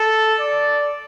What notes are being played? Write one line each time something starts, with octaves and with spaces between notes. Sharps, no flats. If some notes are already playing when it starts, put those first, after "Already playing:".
Already playing: A4
D5